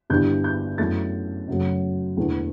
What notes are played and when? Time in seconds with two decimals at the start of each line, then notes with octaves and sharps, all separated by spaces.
0.10 G1 G2 E3 G3 G6
0.44 G6
0.78 F#2 E3 A3 A6
1.48 F#2 C#3 F#3 A3
2.17 E1 E2 D3 A3